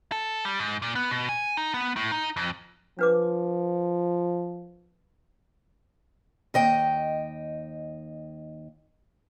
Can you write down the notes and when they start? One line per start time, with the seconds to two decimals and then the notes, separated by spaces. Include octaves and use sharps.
0.12 A4
0.45 G3
0.60 G#2
0.82 A#2
0.95 B3
1.11 B2
1.29 G#5
1.57 D#4
1.74 B3
1.96 A2
2.12 D#4
2.37 F2
2.99 F3 D4 B4 D6
6.54 D#2 D#5 G5